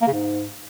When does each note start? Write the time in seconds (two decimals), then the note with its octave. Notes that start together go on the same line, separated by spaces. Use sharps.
0.02 A#3
0.07 C#3
0.13 G#2